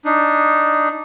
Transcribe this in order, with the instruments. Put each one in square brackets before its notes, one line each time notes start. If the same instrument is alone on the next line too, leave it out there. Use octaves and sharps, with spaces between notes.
[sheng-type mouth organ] D4 D#4